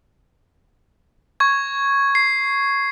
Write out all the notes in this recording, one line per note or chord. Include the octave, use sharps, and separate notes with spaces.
C#6 G#6
C7